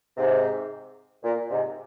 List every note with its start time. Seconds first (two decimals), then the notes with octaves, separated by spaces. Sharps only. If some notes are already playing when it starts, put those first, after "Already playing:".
0.17 G#2 C3
1.23 A#2
1.50 G#2 C3